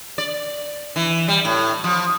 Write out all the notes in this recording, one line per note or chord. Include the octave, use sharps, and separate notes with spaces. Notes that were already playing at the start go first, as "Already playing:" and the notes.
D5
E3
G3
A2
F3